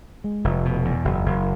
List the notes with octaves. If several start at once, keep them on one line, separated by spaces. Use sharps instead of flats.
G#3
F1
B2
E2
F#1
F#1